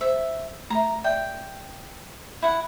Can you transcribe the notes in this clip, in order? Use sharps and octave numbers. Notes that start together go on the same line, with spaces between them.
C5 E5
A3 E5 A#5
D5 E5 G5
E4 F#5